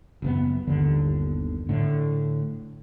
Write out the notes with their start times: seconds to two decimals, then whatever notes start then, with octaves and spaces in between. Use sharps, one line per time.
0.22 F#1 A#2 B3
0.67 G1 D#2 D3
1.69 A2 D3